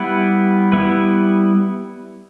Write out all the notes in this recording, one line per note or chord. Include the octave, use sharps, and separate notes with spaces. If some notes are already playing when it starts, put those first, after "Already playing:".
Already playing: G3 B3 E4 B4
G3 B3 E4 B4